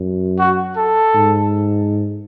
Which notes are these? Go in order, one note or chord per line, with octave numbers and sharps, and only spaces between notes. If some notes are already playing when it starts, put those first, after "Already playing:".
Already playing: F#2
F#4
A4
G#2